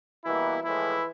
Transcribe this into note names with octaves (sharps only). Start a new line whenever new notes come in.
B2 E3 G3 A#3 E4
A2 E3 F3 G#3 E4